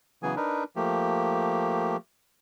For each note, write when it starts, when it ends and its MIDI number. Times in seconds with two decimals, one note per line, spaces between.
0.23 0.35 49
0.23 0.35 52
0.23 0.35 54
0.23 0.35 59
0.23 0.35 68
0.23 0.35 80
0.36 0.64 62
0.36 0.64 63
0.36 0.64 70
0.36 0.64 71
0.76 1.97 53
0.76 1.97 57
0.76 1.97 58
0.76 1.97 67